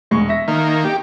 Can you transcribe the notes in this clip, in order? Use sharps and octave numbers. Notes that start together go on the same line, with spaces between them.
E1 G#3 C#6
E5 A#6
D#3 A#3
G4